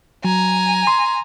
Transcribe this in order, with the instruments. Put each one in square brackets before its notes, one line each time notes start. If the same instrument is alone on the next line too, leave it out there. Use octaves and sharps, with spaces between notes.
[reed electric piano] F#3 [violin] G#5 A#5
[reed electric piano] C6